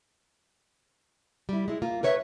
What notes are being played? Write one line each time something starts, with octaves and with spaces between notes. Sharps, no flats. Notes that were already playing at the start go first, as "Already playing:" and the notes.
G3 E4
G#3 E4
A#3 F4
A#4 B4 C#5 E5